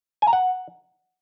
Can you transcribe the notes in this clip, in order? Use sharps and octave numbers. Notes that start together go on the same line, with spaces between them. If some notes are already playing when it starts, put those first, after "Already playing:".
G#5
A#5
F#5